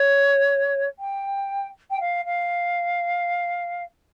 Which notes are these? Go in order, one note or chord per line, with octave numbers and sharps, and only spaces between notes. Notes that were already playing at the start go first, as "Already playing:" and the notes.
Already playing: C#5
G5
G5
F5
F5